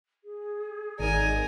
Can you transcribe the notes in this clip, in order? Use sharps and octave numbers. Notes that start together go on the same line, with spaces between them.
G#4
G#1 D#4 A#4 D5 G#5